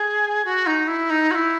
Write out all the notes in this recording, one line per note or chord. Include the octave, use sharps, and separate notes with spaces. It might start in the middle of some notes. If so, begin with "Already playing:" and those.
Already playing: G#4
F#4
D#4
E4
D#4
F#4
E4